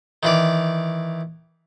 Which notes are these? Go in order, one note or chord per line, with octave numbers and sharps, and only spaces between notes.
D#3 E3 D5